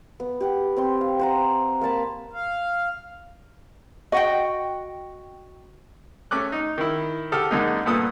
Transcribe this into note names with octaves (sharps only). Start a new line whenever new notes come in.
B3
G4 F#5 G5
C4 G5 C6
F5
C5 F#5 A#5
A#3 F5 A5 B5
F5
F#4 D#5 F#5 G5
A3 C#4 D6 F#6
D#4
D#3 E4
D3 G4 A4 D#6 F6
F#2 D3 G#3 A#3 D#4
D2 G2 A#2 B3 A4 D#6